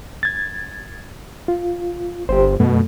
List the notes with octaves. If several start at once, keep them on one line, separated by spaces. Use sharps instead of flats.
G#6 A6
F4
G1 G4 C5
F#2 B2 A3